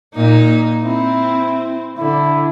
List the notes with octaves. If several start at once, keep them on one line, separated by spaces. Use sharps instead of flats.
A#2 D#4
C4 E4
D3 E4